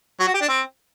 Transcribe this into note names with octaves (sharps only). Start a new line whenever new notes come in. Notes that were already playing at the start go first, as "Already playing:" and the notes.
F#3
F#4
G4
D4
C4